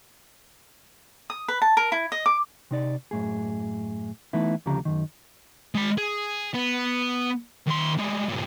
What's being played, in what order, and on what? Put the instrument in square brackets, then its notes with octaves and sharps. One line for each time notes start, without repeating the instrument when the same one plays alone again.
[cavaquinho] D#6
B4
A5
A#4
E4
D#5
D6
[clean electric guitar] C3 D#4 D5
F#2 A2 G#4
E3 A3 B3 D#4 E4
D2 C#3 F3 G4 A#5
F#2 D#3
[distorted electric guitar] G#3 B5
G#4
B3
D#2 C6
G3 G#3
G2 A#2